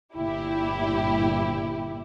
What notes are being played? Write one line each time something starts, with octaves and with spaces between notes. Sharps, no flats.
G1 A#2 E4 G4